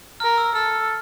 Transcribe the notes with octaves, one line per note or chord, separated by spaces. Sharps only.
A#4 F6
E6
A4 F6